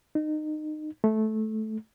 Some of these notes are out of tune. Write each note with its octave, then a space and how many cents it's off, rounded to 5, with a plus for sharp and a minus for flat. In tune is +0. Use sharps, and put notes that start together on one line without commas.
D#4 -25
A3 -15